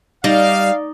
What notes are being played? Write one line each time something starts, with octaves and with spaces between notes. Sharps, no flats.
G3 D#4 D5 D#5 F5